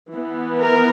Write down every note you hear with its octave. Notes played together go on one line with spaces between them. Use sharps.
E3 B3
A#4